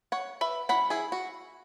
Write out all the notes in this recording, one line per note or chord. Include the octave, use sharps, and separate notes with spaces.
C#5 F#5
B4 E5
F#3 C#4 E4 F#5 B5
E4 G#4
F#4